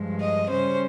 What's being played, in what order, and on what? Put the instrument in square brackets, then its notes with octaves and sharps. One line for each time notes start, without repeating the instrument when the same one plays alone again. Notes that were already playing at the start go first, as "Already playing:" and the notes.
Already playing: [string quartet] G2 F3 G#3
D#5
C#3 G3 C#4 C5